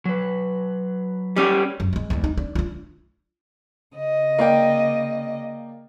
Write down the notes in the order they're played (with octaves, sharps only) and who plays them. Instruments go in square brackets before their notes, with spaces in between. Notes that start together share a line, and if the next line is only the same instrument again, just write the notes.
[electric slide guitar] F#3 B4
[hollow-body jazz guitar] G3 C#4 G4
[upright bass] F#2
F#3 G#3
E2 G#3
D#4
D4
D4 F4
[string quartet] C#3 D#5
[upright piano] A#3 D5 G5